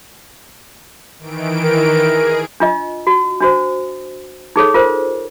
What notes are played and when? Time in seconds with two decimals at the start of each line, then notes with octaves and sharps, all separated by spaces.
1.19 D#3 E3 D7
1.62 A#4
2.03 G#4
2.60 D4 F4 D#5
3.07 F#4
3.40 D4 F#4 C5
4.56 D#4 G#4 A4 C#5
4.74 F4 A#4 C5